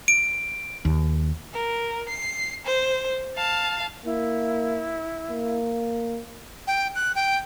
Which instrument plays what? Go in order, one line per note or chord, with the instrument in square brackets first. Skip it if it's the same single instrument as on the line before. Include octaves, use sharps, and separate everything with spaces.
[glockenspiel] D7
[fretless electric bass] D#2
[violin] A#4
C7
C5
F5 A5
[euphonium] A#3 [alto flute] E4
[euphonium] A#3
[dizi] G5
F#6
G5